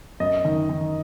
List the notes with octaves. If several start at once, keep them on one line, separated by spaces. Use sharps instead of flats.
F#2 D#5
D#3
D#3